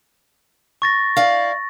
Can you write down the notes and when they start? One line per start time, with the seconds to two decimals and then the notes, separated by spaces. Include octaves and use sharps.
0.82 C#6 A6 A#6
1.17 E4 D5 F5